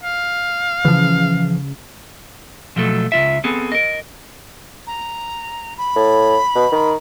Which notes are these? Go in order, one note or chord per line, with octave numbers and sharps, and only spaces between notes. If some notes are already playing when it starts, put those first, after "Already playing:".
F5
C#3 E3 F3
B2 F3 F#3 A3 A4
C#2 D#3 F4 E5
B3 C4 G#4 A4
A#4 D#5
A#5
B5
A2
B2
D#3